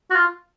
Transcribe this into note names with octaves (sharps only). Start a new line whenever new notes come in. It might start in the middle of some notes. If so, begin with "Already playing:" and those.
F#4
F4